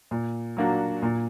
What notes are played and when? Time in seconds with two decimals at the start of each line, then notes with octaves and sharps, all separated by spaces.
0.11 A#2
0.57 F#3 A#3 D4 F#4
1.02 A#2